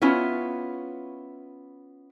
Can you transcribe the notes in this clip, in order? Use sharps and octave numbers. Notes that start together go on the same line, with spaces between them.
B3 C#4 E4 F4